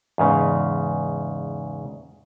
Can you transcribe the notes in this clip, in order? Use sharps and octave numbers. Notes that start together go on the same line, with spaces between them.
E2 G#2 C#3